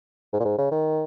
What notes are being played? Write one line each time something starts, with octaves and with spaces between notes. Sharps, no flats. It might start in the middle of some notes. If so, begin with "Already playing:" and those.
G#2
A#2
G#2
C#3
D#3